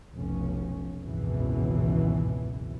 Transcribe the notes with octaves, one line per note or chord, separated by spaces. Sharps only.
F1 B1 C#4
G#1 C#2 F#2 B2 E3